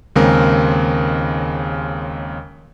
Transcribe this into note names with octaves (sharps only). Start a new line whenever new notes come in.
D#2 C#3 G#3 C4 A#4